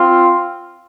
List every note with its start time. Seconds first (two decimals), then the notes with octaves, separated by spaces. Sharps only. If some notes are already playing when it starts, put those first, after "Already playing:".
Already playing: C4 F4